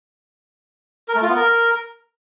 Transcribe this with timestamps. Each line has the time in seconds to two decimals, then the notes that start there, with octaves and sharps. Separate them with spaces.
1.08 A#4
1.15 A3
1.22 F4
1.29 B3
1.36 A#4